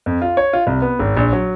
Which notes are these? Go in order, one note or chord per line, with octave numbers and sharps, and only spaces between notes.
F2
F4
C#5
F4
C2
B3
G#1
A#1
F#3